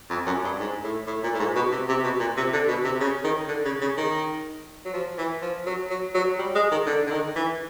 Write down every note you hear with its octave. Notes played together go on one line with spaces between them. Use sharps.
F2
F#2
G2
G#2
A2
A2
A#2
A2
G#2
B2
C3
C3
B2
A#2
C3
D3
B2
C3
C#3
D#3
D3
C#3
C#3
D#3
F#3
F3
E3
F3
F#3
F#3
F#3
G3
G#3
D#3
D3
D3
D#3
E3